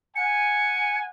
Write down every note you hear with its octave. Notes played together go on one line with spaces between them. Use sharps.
F#5 G#5 C#7